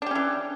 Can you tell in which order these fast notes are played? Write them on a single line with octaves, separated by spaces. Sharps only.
D4 G4 C#4 E3